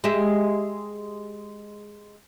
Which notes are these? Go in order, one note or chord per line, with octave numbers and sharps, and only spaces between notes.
G#3 G4 E5